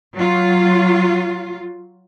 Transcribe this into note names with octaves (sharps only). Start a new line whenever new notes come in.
F#3 F4